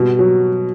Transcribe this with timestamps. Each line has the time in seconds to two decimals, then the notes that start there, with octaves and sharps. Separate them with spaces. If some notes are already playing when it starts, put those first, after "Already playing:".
Already playing: B2 G3
0.19 F#3